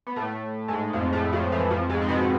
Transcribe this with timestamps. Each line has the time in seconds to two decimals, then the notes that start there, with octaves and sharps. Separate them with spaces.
0.07 B3
0.16 A2 A3
0.68 G#2 G#3
0.93 F2 F3
1.13 A2 A3
1.33 F2 F3
1.52 E3
1.70 F2 F3
1.89 G#2 G#3
2.02 C4
2.09 B2 B3